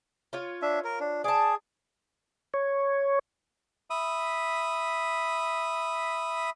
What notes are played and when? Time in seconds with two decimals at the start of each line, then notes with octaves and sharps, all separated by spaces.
0.33 F4 C#5
0.62 D4 E5
0.84 A#4
1.00 D4
1.24 G#4 D5 A5
2.54 C#5
3.90 E5 B5 D#6